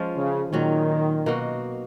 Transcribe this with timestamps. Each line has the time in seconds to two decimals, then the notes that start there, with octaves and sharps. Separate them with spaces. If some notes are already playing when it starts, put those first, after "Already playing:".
Already playing: F3 G#3 C#4 F4
0.16 C#3
0.52 A#2 D#3 F#3 C#4
1.26 B2 A#3 D#4 F#4